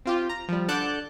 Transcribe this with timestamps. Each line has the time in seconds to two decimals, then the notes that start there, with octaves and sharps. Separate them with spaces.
0.05 C4 F4 G4
0.29 A#5
0.48 F3 G3
0.68 D3 D5 F#5 A5 F#6 G6